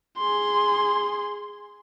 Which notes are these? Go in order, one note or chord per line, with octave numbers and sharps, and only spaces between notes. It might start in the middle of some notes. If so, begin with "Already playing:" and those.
G#4 C6